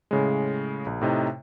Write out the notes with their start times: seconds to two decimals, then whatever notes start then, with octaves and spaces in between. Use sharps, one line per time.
0.11 A2 C#3 G#3
0.86 A#1
1.01 A2 C3 D#4